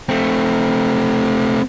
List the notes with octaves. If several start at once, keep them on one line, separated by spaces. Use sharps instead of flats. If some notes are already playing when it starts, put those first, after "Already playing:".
A3 C4